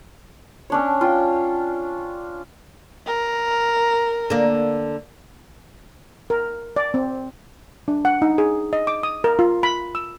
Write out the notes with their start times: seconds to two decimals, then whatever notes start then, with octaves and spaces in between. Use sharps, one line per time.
0.70 C#4 D4 C#5
1.01 F4 G5
3.07 A#4
4.30 D3 A#3
6.30 A#4
6.76 D5
6.94 C4
7.88 D4
8.05 F#5
8.22 D#4
8.38 G#4
8.73 D#5
8.87 D6
9.03 D#6
9.24 A#4
9.39 F4
9.63 B5
9.95 E6